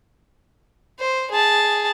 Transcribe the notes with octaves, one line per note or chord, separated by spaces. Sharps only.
C5
G#4 A5